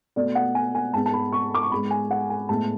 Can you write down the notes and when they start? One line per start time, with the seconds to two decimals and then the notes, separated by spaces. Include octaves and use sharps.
0.16 B2 A3 D5
0.35 F#5
0.55 G#5
0.75 G#5
0.94 G#2 G#3 B3 A5
1.06 A5
1.13 B5
1.33 C#6
1.55 D6
1.63 C#6
1.72 G#2 G#3 B3 B5
1.91 G#5
2.11 F#5
2.30 G#5
2.49 A2 G#3 B3 A5